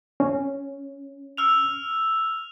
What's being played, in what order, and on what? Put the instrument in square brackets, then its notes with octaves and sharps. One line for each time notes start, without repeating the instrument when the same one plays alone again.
[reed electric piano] C#4
[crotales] E6 F6 F7